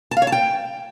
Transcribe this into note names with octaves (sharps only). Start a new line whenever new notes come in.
A5
F5
C#5
A5
G5